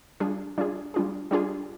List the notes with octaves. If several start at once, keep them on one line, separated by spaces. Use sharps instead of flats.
G3 D4 F4 G#4
G3 D4 F4 G#4
G3 D4 F4 G#4
G3 D4 F4 G#4